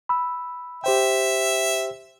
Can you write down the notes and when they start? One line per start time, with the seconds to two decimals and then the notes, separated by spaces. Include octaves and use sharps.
0.09 B5 E6
0.84 G4 C5 E5 G5